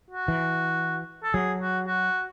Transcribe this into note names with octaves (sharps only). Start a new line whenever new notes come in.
F#4
E3
A4
F#3 G#4
F#4
F#4